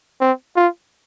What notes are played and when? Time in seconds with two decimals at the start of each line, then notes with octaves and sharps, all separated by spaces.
0.21 C4
0.56 F4